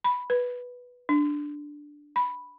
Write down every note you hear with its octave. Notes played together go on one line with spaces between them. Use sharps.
B5
B4
D4
B5